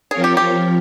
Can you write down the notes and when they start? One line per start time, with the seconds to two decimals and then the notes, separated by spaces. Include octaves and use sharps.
0.11 F3 C4 F4 G#4 A#4 C#5
0.24 G4
0.37 G4
0.50 F3